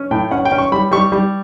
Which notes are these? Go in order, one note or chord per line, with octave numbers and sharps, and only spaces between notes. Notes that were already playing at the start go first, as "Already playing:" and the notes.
Already playing: C#4
A2 G5
C#4 F#5
G5
C#4
C#6
G3 B5
G3 C#6
G3